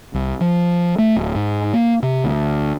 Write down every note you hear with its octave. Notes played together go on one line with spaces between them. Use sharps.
C2
F3
A3
D1
G#2
A#3
C3
D2